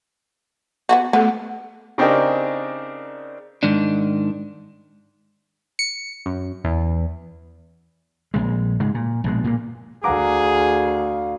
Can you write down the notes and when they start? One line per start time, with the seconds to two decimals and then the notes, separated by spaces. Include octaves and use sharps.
0.89 B3 C#4 F#4
1.13 A3 B3 A4
1.98 C#3 C4 D4 D#4 G4 A#4
3.63 G#2 D#3 D4
5.79 C#7
6.26 F#2
6.64 E2
8.34 A#1 E2 G#3
8.80 G#2 C#3 G#3
8.94 A#2
9.24 A#1 B2 G#3
9.44 A#2 A#3
10.04 D2 G#4 F5 F#5 A#5 D6